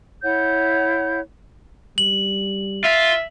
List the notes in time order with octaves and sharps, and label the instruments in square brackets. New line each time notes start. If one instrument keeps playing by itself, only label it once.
[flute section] E4 C#5 F#5 G6
[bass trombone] G3 [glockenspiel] F#7
[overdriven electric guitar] F4 [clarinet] E5